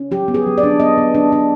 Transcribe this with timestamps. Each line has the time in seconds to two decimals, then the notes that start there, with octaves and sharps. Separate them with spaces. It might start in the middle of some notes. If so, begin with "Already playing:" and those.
Already playing: C#4
0.11 F#3 G4
0.28 B3
0.34 G#4
0.46 F#3
0.58 D5
0.63 D4
0.80 B3 D#5
0.97 B3
1.15 D4
1.32 D4